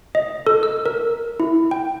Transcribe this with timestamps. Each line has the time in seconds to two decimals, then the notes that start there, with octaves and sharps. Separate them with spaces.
0.15 D#5
0.47 A4
0.63 E6
0.86 A#4
1.40 E4
1.71 G5